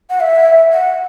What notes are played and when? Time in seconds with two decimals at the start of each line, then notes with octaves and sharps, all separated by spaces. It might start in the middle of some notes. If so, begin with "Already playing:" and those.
0.10 F#5
0.20 E5
0.73 F#5